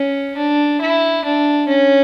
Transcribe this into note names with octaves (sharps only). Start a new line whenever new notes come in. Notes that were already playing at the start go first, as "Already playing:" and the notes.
Already playing: C#4
D4
E4
D4
C#4